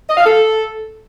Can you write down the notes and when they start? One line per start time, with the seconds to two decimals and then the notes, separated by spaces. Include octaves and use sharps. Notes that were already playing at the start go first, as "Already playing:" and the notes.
0.09 D#5
0.17 F5
0.26 A4